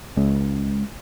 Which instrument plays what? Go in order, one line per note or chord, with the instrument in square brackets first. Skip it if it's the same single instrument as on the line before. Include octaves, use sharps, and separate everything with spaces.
[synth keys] C#2